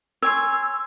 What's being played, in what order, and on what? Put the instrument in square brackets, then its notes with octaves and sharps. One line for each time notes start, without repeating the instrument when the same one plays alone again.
[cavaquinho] C#5 G#5 C6 [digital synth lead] E6